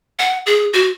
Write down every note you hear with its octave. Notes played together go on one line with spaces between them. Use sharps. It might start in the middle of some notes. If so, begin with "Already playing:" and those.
F#5
G#4
F#4